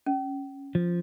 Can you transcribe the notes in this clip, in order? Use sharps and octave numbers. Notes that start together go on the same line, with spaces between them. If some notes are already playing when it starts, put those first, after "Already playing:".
C#4
F3